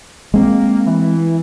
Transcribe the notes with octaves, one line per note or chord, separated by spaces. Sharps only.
G#3 A#3 C4
E3